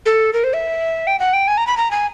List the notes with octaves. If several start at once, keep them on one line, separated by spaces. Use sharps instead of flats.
A4
A#4
C5
E5
G5
F#5
G5
G#5
A#5
B5
A#5
G#5